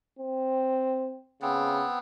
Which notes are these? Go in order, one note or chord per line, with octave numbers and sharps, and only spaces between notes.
C4
C#3 B3 C4